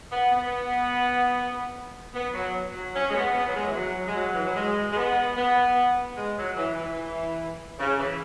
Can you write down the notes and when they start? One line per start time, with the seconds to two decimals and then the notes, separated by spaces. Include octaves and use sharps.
0.11 B3
0.32 B3
2.13 B3
2.33 F#3
2.73 F#3
2.94 C#4
3.08 G#3
3.14 B3
3.34 B3
3.47 F#3
3.54 G#3
3.65 E3
3.75 F#3
4.06 G#3
4.15 F#3
4.33 E3
4.44 F#3
4.55 G#3
4.91 G#3
4.96 B3
5.36 B3
6.16 G#3
6.37 F#3
6.57 E3
6.77 E3
7.78 C#3
7.98 E3